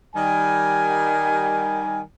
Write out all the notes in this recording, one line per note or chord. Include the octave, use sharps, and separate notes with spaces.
D#3 G3 G#5